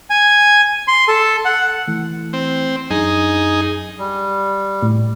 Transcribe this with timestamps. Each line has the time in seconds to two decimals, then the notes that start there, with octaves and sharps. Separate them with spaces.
0.10 G#5
0.88 C6
1.08 A4
1.45 F#5
1.87 E3 A3
2.33 C4
2.90 F#2 D4 D#4 G#4
3.98 G3
4.83 A2